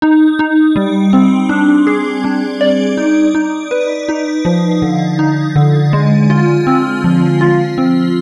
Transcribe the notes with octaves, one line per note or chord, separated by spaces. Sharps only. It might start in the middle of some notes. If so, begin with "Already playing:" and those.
D#4
D#4
G3
C4
D4
G#4
D4
D5
D#4
D#4
B4
D#4
F3
D3
D#4
D3
G#3
F4
C4
F3
F4
C4